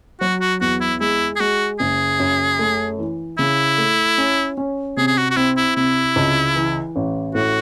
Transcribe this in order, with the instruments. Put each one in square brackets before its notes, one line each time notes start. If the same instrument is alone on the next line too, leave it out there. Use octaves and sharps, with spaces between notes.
[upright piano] F#3 [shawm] F#4
[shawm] F#4
[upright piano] E2 [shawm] F#4
[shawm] E4
[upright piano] G#3 [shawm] E4
[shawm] G#4
[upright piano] G#3 [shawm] F#4
[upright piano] F#1 [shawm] G#4
[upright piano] F#2
A3
E3
[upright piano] C#3 [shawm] E4
[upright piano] A3
C#4
C#4
[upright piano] C3 [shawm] G#4
[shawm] G#4
F#4
F#4
[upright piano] C4 [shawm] E4
[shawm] E4
[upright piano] C3 [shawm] E4
[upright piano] C#2
E3
A1
[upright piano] A2 [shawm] F#4